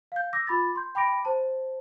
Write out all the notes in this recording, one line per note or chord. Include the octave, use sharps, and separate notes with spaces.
F5 G6
D6 E6 A#6
F4 B5 D6 A6
C6 G6
G5 B5 D6 A#6 D7
C5 A5